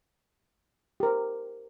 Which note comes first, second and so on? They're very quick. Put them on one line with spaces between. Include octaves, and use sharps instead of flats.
G4 A#4 C5